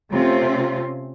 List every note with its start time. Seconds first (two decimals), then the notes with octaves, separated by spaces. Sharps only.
0.11 C3 A3 C4 C#4 F4